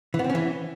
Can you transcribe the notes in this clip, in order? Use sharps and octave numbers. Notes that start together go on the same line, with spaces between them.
E3
B3
C4
C#4
E3